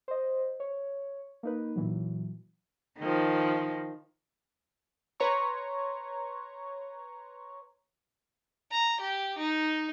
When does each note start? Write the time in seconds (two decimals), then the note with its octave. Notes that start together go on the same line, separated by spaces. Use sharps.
0.08 C5 D#5
0.60 C#5
1.43 A#3 D#4 B4
1.76 A#2 E3 F#3
2.99 D#3 F3
5.20 B4 C#5 A#5 C6 C#6
8.71 A#5
9.00 G4
9.38 D#4